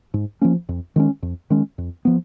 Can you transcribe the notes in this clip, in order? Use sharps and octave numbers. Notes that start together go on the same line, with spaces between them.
G#2
F3 A#3 C#4
F2
D#3 G#3 C#4
F2
D#3 G#3 C#4
F2
F3 B3